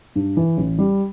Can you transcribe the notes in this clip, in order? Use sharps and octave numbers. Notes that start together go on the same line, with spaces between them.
G2
E3
A1
G3